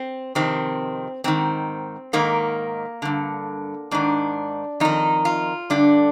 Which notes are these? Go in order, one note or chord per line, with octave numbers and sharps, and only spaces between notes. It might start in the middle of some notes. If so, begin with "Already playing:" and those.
Already playing: C4
F2 C3 D#3 C4
G#2 D#3 C4
G#2 D#3 A#3
G2 D3
G#2 D#3 D4
F2 D#3 D#4
F4
G2 D3 D4